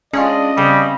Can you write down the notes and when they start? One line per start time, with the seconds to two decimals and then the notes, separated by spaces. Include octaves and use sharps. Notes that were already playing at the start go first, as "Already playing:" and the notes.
0.13 G#3 C#4 D4 F4 D#5
0.57 C#3 G3 C4